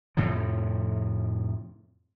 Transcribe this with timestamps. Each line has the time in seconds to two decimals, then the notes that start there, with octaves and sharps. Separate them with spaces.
0.17 F2 A2 C3 F3